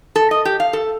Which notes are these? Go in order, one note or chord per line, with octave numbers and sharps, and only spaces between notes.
A4
D#5
G4
F5
A4